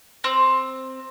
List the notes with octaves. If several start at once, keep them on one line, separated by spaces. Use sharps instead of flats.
C4